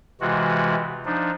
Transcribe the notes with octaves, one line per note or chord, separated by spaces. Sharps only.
C3 E3 G#3 F4 F#4
F3 D4 D#4